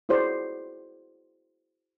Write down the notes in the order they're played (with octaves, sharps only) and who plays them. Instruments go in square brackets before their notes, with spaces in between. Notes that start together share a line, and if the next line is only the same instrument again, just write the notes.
[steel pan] E4 F#4 G#4 C5 D5